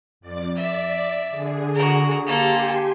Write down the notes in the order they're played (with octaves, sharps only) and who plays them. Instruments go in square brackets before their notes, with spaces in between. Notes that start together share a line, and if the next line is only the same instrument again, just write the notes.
[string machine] F2 D5 A6
[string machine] D5 [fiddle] E5
[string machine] D3 G#4
[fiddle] F#4 A#4
[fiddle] A#3 A4 [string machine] G4 G#5 C6